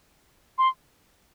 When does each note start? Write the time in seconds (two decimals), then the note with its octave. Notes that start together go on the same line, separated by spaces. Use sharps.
0.58 C6